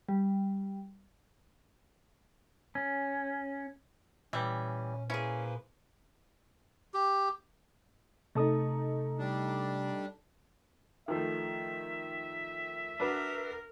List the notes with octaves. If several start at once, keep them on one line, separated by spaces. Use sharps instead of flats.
G3
C#4
A#2 E3 G3 C#4 E5
A#3 C#4 E4 G#4 B4 C5
G4
C3 A3 D#4 A5 D#6
G3 D4
D#3 F3 A3 E5
D4 F#4 A#4 B4